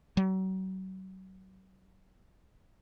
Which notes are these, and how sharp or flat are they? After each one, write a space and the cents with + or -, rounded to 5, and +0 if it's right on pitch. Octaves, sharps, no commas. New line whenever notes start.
F#3 +35